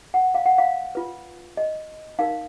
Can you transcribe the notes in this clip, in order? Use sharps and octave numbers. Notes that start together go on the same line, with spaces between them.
F#5
F5
F#5
F5
F4 B4
D#5
D#4 A#4 F5